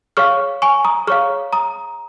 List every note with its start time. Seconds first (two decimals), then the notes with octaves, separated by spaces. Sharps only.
0.17 G#4 C#5 F5 C#6 F6
0.62 G#5 C#6
0.85 A#5 D#6
1.07 G#4 C#5 F5 C#6 F6
1.53 A#5 D#6